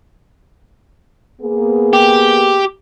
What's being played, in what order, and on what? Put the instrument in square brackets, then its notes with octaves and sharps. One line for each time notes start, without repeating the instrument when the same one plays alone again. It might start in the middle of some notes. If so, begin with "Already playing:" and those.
[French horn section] A#3 B3 G#4
[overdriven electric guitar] G4